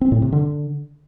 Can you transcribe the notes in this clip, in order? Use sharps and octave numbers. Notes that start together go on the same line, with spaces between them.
C4
A2
C3
D3